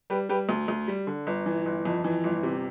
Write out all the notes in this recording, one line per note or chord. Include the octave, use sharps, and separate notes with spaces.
G3 G4 B4
G3 G4 B4
D2
D2
G3
D3
G1
E3
G1
F2
E3
G1
C3